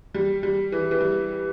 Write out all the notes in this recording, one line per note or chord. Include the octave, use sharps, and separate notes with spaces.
G3
G3
E3
E3
G3